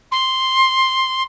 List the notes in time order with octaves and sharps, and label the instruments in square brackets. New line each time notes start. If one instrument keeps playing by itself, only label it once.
[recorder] C6